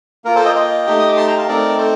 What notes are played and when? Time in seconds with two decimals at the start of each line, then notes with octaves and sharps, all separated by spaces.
0.25 A#3 F4 A#4
0.35 A4 C5
0.45 D#5 G5
0.56 D#5 G5
0.87 A3 D#4 G4
0.99 D#6
1.08 D6
1.17 A5 C6
1.27 G5 A#5
1.38 F5 A5
1.47 A3 C4 D#4 A#4 D5
1.78 A4 C5